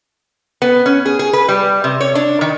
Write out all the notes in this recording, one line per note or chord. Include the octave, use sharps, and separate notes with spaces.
B3
C#4
G#4
G#4
B4
G3
C3
C#5
D4
D#3